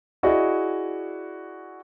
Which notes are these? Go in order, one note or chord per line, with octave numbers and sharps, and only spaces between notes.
E4 F#4 G#4 D5 D#5